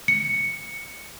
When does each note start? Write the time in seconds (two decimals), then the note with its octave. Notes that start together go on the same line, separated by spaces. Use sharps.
0.08 C#7